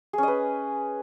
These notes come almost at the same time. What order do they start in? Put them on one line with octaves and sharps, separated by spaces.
G#4 C#4 D#5 B4